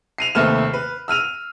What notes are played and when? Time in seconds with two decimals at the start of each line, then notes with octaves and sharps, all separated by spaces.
0.18 C7 D#7 F7
0.35 D#2 C3 A3 B4 F6 E7
0.73 B4
1.08 E6 F6 D#7 F7